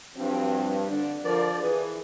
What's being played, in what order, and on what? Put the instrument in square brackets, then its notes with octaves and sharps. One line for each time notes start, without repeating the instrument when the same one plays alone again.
[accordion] G2 [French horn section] F3 F#3 C4
[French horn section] D3 D4
[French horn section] D3 F4 A#4 [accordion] F3 D5
[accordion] E3 [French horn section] G#4 A#4 B4